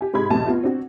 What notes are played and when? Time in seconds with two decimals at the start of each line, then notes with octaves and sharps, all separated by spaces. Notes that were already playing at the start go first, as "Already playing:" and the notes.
0.01 G4 G#5
0.14 G#2 C3 G4 G#4 B5 G#6
0.30 B1 E2 C3 A3 A5
0.47 B3 F4 F#4
0.64 C4 D4 F#4